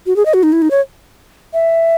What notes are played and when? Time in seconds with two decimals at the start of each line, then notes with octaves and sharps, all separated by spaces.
0.06 F#4
0.16 G#4
0.26 D#5
0.34 F#4
0.43 D#4
0.52 E4
0.62 D#4
0.71 C#5
1.53 E5